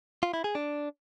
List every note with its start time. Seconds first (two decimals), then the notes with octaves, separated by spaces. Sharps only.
0.23 F4
0.34 E4
0.44 G#4
0.55 D4